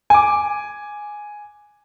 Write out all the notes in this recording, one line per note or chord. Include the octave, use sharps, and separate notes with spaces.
G#5 D6